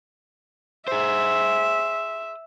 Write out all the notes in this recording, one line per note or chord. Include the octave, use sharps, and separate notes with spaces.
G#4 C5 E5